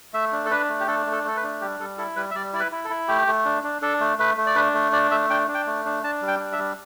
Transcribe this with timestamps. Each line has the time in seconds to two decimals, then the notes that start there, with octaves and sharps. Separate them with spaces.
0.13 A3 E5
0.32 D4
0.46 A4
0.51 D4 B4
0.69 A3
0.80 G4
0.87 D4 A4
1.06 A3
1.12 A4
1.24 A3 A4
1.36 B4
1.43 D4
1.61 G3 G4
1.80 G3 A4
1.98 E4 A4
2.16 G3 B4
2.31 E5
2.34 G3 D5
2.53 E4 D5
2.60 B4
2.72 E4
2.85 A4
2.90 E4
3.08 A3 G4
3.27 A3
3.45 D4
3.64 D4
3.82 D4 A4
4.00 A3
4.19 A3 B4
4.37 A3
4.46 D5
4.56 D4 B4
4.74 A3
4.92 D4 D5
5.11 A3 E5
5.30 D4 G5
5.48 D4
5.54 G5
5.67 A3
5.85 D4
6.03 D4 A5
6.22 G3
6.28 G5
6.40 D4
6.52 E5
6.59 G3